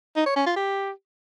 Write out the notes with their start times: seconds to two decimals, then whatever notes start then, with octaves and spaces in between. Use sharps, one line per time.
0.16 D#4
0.26 C#5
0.36 C#4
0.46 F4
0.56 G4